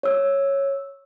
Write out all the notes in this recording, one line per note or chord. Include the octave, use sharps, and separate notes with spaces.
C#5 E6